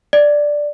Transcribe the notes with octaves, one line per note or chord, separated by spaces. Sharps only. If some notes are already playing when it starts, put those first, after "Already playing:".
D5